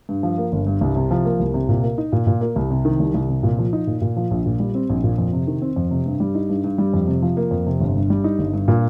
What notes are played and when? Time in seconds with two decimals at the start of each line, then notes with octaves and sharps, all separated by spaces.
0.09 G2
0.23 F3
0.38 A#3
0.52 G1
0.67 G2
0.81 C2
0.96 C3
1.11 F3
1.25 A#3
1.40 C2
1.54 C3
1.69 A#2
1.83 A#3
1.98 D#4
2.12 A#2
2.27 A#2
2.41 A#3
2.56 C2
2.71 C3
2.85 D#3
3.00 C2
3.14 C2
3.29 C3
3.43 A#2
3.59 F3
3.73 D#4
3.87 A#2
4.02 A#2
4.16 F3
4.31 A#1
4.46 A#2
4.60 G3
4.75 C4
4.89 A#1
5.04 A#2
5.18 F2
5.33 C3
5.47 D#3
5.62 C4
5.76 F2
5.91 C3
6.06 G2
6.20 G3
6.35 D#4
6.49 G2
6.64 G2
6.78 G3
6.93 F2
7.08 C3
7.22 F3
7.37 A#3
7.51 F2
7.66 C3
7.80 G1
7.95 G2
8.10 G3
8.24 D#4
8.39 G1
8.53 G2
8.68 A#2